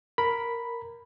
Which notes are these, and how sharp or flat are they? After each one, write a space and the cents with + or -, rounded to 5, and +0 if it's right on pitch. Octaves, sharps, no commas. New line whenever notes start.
A#4 +0 B5 +0